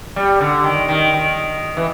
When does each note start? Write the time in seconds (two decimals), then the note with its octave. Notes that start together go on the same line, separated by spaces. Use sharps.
0.16 G3
0.41 D3
0.64 D#3
0.88 D#3
1.13 D#3
1.77 E3